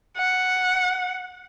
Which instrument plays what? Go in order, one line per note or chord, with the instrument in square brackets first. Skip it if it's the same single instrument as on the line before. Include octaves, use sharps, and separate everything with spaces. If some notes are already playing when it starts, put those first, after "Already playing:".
[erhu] F#5